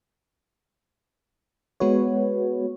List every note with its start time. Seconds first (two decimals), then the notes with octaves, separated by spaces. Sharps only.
1.80 G#3 B3 F#4 B4 C#5